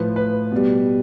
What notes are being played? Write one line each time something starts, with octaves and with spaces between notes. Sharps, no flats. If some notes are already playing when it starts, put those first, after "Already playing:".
Already playing: A2 F3 B4
B4
B2 G3